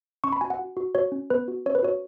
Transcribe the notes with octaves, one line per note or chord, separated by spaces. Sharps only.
C#4 C#6
B5
F#4 G#5
F#5
F#4
F#4
F#4 C#5
C#4
B3 B4
F#4
C#4 C#5
B4
F#4 C#5